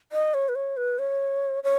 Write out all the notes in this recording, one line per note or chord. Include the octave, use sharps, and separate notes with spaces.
D#5
C#5
B4
C#5
B4
C#5
C#5